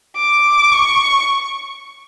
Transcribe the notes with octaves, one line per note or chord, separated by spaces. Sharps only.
D6
C#6